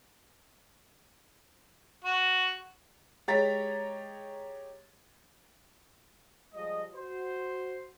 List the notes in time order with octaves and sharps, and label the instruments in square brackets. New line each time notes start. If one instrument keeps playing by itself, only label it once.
[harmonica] F#4
[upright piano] G#3 G4 C#5 A#5 A6 B6
[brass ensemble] F3 G3 G#3 G4 D#5
F#4 C5